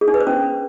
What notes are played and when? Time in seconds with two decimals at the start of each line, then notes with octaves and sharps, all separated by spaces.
0.01 G#4
0.08 D4
0.14 B4
0.20 C5
0.27 C#4